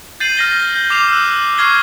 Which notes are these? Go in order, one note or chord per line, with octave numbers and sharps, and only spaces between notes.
G6 A6 C7 D#7 F#7
F6 A#6 G7
G6
D6 C7 E7 F7
E6 F#6
C#6 F6 G#6 C7 G7